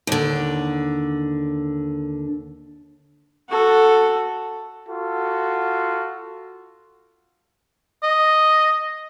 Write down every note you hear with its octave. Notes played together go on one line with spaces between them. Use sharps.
D#2 D3
F#4 A4
F4 F#4 A4
D#5